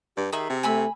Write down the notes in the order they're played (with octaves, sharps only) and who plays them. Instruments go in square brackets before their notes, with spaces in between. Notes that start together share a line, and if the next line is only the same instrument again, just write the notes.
[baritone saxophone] G2 [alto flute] G4
[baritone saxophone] D#3 [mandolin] G#4 E5
[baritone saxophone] C3
[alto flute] A3 [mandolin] G#5 B5 E6